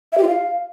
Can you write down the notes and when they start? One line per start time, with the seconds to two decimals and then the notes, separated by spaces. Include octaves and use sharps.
0.12 E5
0.18 G4
0.23 F4
0.28 F5